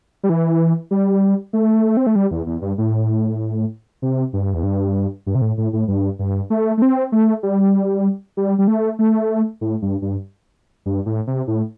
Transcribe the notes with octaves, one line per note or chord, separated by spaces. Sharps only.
G3
E3
G3
A3
C4
A3
G3
E2
E2
G2
A2
C3
G2
E2
G2
G2
C3
A2
A2
A2
G2
G2
A3
A3
C4
A3
G3
G3
G3
A3
A3
A2
G2
G2
G2
A2
C3
A2